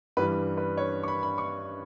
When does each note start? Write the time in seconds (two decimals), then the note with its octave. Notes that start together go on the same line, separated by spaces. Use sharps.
0.17 G2 E3 G3 B4
0.57 B4
0.77 C#5
1.03 C#6
1.08 B5
1.23 B5
1.38 C#6